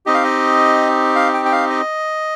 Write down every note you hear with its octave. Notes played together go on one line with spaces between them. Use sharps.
C4 D#4 G4 D#5
F5
D#5
F5
G5
G5
F5
D#5